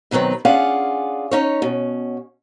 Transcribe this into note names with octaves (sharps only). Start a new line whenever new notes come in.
B2 D#3 F#3 C4 B4
C#4 D4 F4 G#4 F5 F#5
C#4 D#4 C#5
B2 C#4